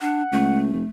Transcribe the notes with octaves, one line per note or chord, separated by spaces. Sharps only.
D4 F#5
C#2 A3
F1